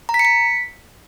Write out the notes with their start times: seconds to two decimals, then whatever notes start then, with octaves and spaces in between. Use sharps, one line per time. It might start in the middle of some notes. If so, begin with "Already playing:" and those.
0.09 A#5
0.14 B6
0.19 C#7
0.25 B6